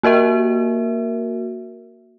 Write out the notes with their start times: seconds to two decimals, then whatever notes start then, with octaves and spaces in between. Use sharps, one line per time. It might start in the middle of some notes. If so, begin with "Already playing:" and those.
0.03 A#3 F#4 A#4 E5